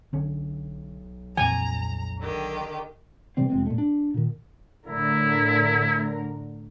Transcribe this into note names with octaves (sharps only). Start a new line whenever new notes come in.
B1 D3 C#4
F2 A#2 E3 G#5 A#5
D3 D#3 G4
C3 E3 G3 C4
F1 G#3 C4
A#2 A3
D4
A#2 D#3
A2 D3 E4 A#4